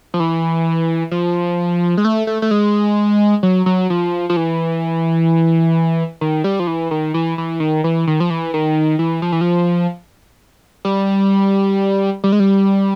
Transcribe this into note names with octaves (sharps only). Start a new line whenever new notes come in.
F3
E3
F3
G#3
A3
A3
A3
G#3
F#3
F#3
F3
F3
E3
D#3
G3
F3
E3
D#3
E3
E3
D#3
E3
D#3
F3
E3
D#3
E3
F3
E3
F3
G3
G3
G#3
G3